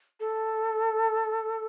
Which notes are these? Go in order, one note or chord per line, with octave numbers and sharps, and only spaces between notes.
A4